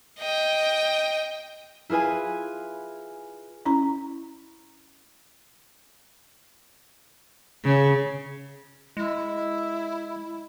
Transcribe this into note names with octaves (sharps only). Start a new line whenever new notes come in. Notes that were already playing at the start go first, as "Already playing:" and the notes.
D#5 G5
E4 F4 G#4 B4 G#5
C#4 E4 A#5 B5
C#3
G#3 E4